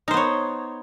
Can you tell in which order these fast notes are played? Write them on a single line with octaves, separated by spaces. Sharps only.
D#4 C5 B3 C#5